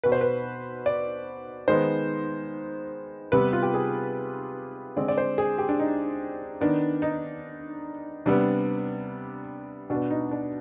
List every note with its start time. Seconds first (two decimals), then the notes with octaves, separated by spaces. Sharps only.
0.03 B2 B3 B4
0.12 C5
0.21 B4
0.86 D5
1.68 D#3 G#3 B3 C5
3.32 C3 G3 B3 B4
3.53 F4
3.62 G4
3.74 G#4
4.96 D3 G#3 C4 D5
5.08 D5
5.18 C5
5.38 G#4
5.58 G4
5.69 D4
5.79 D#4
6.61 D#3 B3 D4
7.02 D#4
8.26 C3 G3 B3 D4
9.90 B2 B3 D4
10.10 D#4
10.31 D4